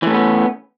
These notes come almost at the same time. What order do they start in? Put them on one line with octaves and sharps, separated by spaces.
E3 A3 C#4 B3